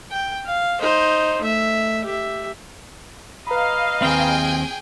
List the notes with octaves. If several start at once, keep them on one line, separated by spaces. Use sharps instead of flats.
G5
F5
D#4 C5
A3 E5
G4 E5
B4 D#5 F5 A#5 B5
D#2 C4 G#4 G5 G#5